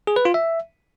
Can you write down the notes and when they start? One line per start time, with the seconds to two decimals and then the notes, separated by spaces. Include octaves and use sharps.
0.07 G#4
0.16 B4
0.25 F4
0.34 E5